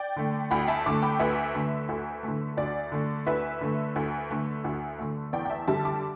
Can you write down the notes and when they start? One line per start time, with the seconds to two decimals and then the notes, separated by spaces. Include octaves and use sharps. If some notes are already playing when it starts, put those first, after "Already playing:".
Already playing: D5 G5
0.16 D3 A3
0.51 D2 G5 B5
0.68 E5 A5
0.86 D3 A3 A5 D6
1.02 G5 B5
1.19 D2 B4 E5
1.55 D3 A3
1.89 D2
2.23 D3 A3
2.57 D2 D5
2.92 D3 A3
3.27 D2 B4 E5
3.61 D3 A3
3.96 D2
4.30 D3 A3
4.64 D2
4.99 D3 A3
5.33 E2 D5 G5
5.45 G5
5.50 E5 A5
5.67 D3 G3 E5 A5
5.85 A5 D6